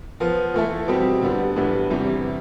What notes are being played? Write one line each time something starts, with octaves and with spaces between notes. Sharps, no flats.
F3 B3 F4
E3 A3 E4 A4
B2 G3 C4 G4
D3 G3 B3 D4
A2 E3 G3 B3 D4
E2 C3 E3 G3